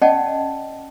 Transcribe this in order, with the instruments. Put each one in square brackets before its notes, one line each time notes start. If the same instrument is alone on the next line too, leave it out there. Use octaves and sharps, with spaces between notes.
[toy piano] C#4 D5 D#5 F#5 G5 A5